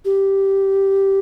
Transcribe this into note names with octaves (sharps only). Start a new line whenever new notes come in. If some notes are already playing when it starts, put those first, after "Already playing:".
G4